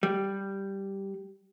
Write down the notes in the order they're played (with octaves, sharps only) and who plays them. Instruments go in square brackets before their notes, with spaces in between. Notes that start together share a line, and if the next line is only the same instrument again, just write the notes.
[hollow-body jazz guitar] G3